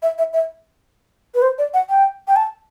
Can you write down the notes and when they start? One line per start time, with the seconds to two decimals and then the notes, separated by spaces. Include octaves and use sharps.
0.02 E5
0.18 E5
0.33 E5
1.35 B4
1.42 C5
1.58 D5
1.74 F#5
1.89 G5
2.28 G5
2.36 A5